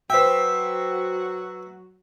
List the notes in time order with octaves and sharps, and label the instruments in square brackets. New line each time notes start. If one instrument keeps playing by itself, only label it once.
[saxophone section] F#3 F#4 [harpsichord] B4 E5 [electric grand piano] C5 G5 [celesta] E6 B6